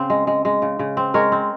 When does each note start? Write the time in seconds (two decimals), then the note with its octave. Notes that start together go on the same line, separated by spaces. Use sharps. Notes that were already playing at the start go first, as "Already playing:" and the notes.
Already playing: C#3 C4 C5
0.10 G#3
0.27 G#3
0.45 G#3
0.62 C#3
0.79 C#3
0.97 C4
1.14 G#3 A#4 C#5
1.32 C4